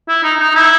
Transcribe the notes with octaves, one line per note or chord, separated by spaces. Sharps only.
E4
D#4
D#4
E4